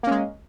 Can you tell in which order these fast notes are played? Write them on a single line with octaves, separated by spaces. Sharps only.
A#3 C#4 G#3